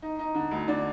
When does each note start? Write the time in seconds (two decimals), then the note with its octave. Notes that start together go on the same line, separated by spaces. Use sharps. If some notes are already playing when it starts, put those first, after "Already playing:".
0.02 D#4
0.19 D#4
0.35 D3
0.51 D2
0.68 D3 D5